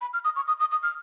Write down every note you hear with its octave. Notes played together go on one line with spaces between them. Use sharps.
B5
F6
D#6
C#6
D#6
D#6
D#6
F6